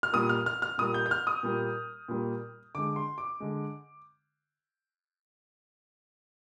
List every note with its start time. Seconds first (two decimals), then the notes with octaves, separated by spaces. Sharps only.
0.03 F6
0.13 A#2 G3 A#3 D#6
0.29 F6
0.46 F6
0.62 F6
0.78 A#2 G3 A#3 D#6
0.94 G6
1.06 G6
1.11 F6
1.27 D#6
1.43 A#2 G3 A#3
2.08 A#2 G3 A#3
2.75 D3 G#3 D6
2.96 C6
3.18 D6
3.40 D3 G#3